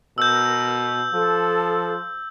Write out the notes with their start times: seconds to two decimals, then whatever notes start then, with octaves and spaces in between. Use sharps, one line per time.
0.18 B2 A#4 E6 G6
1.13 F3 A4